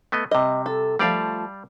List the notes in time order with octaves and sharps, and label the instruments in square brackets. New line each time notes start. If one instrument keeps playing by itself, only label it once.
[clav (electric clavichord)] A3 B3 D#5
[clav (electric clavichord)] C3 G3 [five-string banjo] D#5
[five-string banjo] A4
[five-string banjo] F3 A3 [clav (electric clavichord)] G3 D5 F5